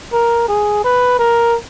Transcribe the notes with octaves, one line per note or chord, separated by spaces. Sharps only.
A#4
G#4
B4
A#4